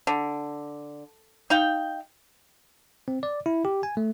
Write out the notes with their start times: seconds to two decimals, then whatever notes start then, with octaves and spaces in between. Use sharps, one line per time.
0.07 D3
1.50 D#4 F5 G5
3.08 C4
3.23 D5
3.46 E4
3.65 G4
3.83 G#5
3.97 A3